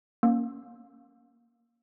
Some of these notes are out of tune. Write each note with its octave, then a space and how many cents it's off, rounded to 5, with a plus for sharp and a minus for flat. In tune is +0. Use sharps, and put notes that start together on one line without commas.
A#3 +5 C#4 +0